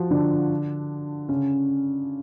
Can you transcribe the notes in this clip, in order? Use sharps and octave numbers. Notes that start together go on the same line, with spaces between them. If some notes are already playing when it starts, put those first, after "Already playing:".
Already playing: F3 F4 F#4
D3 D4
C#3 C#4